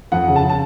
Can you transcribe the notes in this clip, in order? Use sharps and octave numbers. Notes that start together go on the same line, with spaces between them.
F2 F#5
C#3
A5
C#3
A5